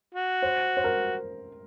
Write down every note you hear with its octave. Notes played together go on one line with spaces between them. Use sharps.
F#4
C5
C5
A#4